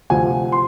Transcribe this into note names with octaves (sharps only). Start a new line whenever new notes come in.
D2 C3 F3 G#5
C6